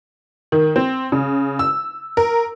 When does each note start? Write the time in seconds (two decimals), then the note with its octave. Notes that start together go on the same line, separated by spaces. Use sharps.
0.52 D#3
0.76 C4
1.12 C#3
1.59 E6
2.17 A#4